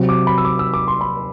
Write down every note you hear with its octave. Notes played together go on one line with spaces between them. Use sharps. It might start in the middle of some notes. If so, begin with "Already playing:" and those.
Already playing: C3 F#3 C4
D6
B5
E6
D6
E6
D6
C6
B5